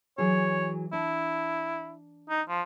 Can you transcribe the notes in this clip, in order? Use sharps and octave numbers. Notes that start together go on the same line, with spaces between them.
E3 F#3 G#4 C#5
D4 E4
D#4
F3